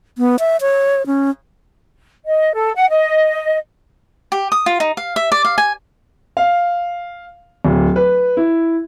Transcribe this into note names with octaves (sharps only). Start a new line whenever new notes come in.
B3
E5
C#5
C#4
D#5
A4
F#5
D#5
G4
D#6
F4
D#4
F5
E5
D5
F5
G#5
F5
D1
B4
E4